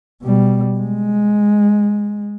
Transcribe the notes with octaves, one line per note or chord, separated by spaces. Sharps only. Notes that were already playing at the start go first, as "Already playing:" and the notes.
B2 G3
G#3